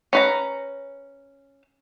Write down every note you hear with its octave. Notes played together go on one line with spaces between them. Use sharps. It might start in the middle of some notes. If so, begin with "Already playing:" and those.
C#4 B4 A#5